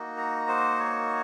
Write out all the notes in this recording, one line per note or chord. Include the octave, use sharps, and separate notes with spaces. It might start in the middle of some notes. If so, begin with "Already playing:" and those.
Already playing: A#3 D#4 F#4
A#5
C5
C#5